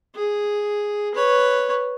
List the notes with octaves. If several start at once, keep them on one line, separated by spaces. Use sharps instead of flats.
G#4
B4 C#5